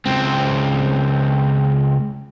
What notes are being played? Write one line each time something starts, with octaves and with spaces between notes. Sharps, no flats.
C#2 C4